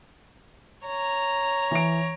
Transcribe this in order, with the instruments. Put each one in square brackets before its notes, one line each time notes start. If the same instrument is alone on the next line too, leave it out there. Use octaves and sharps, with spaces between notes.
[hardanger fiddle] C#5 A#5
[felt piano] E3 D7